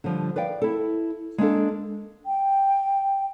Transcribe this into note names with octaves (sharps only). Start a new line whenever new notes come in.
D3 F3 G3
B4 D5 F5 G5
E4 A4
G#3 A#3 D4 A4
G5